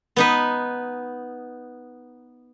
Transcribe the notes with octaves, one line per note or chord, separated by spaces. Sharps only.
B3 D#4 B4